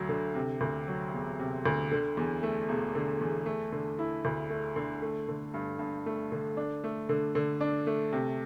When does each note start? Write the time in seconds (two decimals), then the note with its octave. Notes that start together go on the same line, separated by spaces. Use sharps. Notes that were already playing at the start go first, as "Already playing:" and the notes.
Already playing: D2 F#3
0.09 D3
0.35 C3
0.61 D2
0.88 F#3
1.13 E1
1.39 C3
1.66 D2
1.91 D3
2.17 E2
2.43 A3
2.69 E1
2.95 D3
3.21 E2
3.46 A3
3.72 D3
3.99 E4
4.25 D2
4.50 A3
4.76 D3
5.02 A3
5.28 D3
5.54 G2
5.79 G2
6.06 A3
6.32 D3
6.57 D4
6.84 A3
7.09 D3
7.35 D3
7.61 D4
7.87 A3
8.12 C3